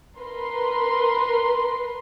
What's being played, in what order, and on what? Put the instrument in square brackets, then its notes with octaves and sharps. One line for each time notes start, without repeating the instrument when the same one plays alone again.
[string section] A#4 B4 C6